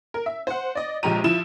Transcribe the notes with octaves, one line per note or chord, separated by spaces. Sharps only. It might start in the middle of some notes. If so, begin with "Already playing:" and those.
A#4
E5
C5 F#5
D5 D#5
A#1 F3 G#3 G4 A#5 D#7
F3 E4 E7